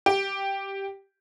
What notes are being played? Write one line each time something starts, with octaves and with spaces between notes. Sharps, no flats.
G4